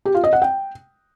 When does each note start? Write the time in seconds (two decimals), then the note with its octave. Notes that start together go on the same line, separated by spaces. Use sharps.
0.05 G4
0.15 F4
0.24 D#5
0.33 F#5
0.42 G5